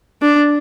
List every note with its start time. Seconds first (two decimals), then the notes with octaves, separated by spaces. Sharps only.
0.22 D4